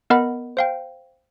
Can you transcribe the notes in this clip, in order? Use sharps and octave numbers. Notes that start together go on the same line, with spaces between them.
B3 A#4 D#5 F#5 B5
C5 F5 G5